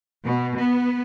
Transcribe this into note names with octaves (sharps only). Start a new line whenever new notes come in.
B2
B3